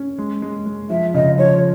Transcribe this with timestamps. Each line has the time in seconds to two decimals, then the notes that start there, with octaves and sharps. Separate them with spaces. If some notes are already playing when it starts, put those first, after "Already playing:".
Already playing: C#4
0.18 G#3
0.42 G#3
0.66 G#3
0.90 F3 E5
1.14 C#3 D#5
1.38 F3 C#5